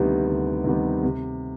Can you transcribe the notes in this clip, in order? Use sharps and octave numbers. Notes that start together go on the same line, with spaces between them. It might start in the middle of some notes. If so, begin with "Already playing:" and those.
Already playing: D2 C3 D#3 G3 B3
D2
C3 D#3 G3 B3
C3